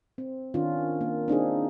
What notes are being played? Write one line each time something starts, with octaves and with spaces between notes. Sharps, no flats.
C4
D#3 C#4 D4 F4
A#3
C4 D4 D#4 G#4